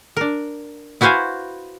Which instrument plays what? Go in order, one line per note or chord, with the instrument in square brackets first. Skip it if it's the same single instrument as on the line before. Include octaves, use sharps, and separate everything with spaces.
[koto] D4 A#4
E4 F#4 B4 C5 F5 G#5